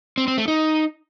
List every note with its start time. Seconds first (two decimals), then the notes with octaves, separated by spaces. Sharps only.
0.18 C4
0.28 C4
0.38 A3
0.48 D#4